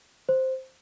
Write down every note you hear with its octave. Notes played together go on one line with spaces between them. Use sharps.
C5